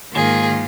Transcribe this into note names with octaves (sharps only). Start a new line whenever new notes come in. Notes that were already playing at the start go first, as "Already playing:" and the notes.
G#2 D#3 A#3 F4 G#4